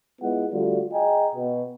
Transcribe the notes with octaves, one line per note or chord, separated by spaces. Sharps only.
G#3 B3 E4 F4 F#5
D3 G3 A3 F4 F#4
G#4 D#5 G5 G#5 A#5
B2